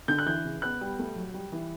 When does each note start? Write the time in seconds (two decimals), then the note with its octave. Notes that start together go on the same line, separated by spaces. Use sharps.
0.08 D3 G6
0.18 F#6
0.26 E3 G6
0.45 C#3
0.62 B3 F#6
0.81 G3
0.99 A3
1.16 F#3
1.34 G3
1.52 E3